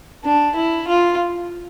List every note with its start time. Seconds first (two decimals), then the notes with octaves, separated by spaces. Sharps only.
0.24 D4
0.55 E4
0.87 F4